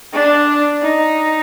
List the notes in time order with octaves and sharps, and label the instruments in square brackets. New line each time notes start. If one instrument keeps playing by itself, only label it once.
[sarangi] D4
D#4